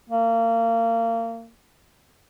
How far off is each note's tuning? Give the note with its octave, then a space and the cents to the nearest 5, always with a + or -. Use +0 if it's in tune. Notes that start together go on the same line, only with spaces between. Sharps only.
A#3 -30